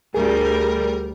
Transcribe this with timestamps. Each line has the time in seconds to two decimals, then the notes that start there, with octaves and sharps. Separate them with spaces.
0.14 D2 G3 G#4 A#4